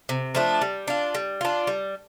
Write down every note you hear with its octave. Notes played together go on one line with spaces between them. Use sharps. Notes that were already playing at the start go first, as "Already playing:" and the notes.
C3
F3 A3 D4
G3
D4 F4
G3
D4 F4
G3